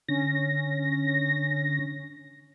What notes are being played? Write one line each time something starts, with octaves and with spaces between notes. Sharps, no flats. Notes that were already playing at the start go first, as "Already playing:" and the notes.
D3 C#4 A#6